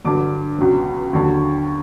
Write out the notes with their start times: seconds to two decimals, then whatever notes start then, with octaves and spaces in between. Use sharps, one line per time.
0.04 G2 D3 F#3 D6
0.58 C#2 B2 F#3
1.13 D#2 D3 F#3